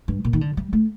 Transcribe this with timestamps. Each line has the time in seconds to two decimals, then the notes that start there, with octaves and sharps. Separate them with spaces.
0.08 G2
0.25 A#2
0.33 D#3
0.41 D3
0.57 G3
0.73 A3